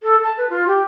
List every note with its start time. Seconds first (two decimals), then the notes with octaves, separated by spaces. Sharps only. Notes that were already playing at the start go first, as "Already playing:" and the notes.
0.03 A4
0.24 A5
0.38 B4
0.50 F4
0.68 G4